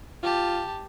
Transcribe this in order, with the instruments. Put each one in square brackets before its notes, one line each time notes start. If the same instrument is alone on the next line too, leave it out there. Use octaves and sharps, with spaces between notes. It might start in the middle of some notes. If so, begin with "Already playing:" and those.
[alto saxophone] F4 [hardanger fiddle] G4 A5